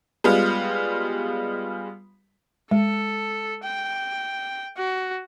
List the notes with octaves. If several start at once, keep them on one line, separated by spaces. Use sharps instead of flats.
G3 G#3 B3 F4
G#3 A4
G5
F#4